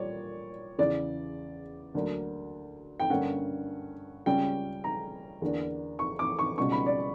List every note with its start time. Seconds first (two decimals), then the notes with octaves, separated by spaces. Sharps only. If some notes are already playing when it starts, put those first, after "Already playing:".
Already playing: A#2 G3 A#3 C#5 D5
0.78 E2 C#3 E3 D5
1.94 D2 D3 F#3 A#3 D4
3.00 G5
3.10 G2 D3 A#3 C#4 F#5
4.26 C#2 C#3 G3 C#4 G5
4.84 A#5
5.41 E2 D3 A#3 D4
5.99 C#6
6.19 D6
6.39 C#6
6.57 C#2 B2 G3 C#4 C#6
6.72 B5
6.86 D5